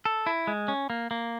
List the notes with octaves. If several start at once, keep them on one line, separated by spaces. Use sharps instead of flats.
A4
E4
G#3
C#4
A#3
A#3